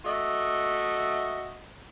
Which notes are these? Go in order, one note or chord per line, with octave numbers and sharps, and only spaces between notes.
A3 F#4 D#5 E5